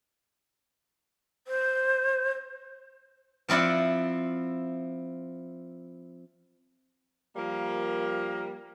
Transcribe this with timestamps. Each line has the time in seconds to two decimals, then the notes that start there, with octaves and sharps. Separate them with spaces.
1.47 C5
3.48 F3 C4 E4 D5 F#5
7.35 F3 G3 A#3